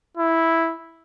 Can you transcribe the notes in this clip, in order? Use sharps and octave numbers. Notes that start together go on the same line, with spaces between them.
E4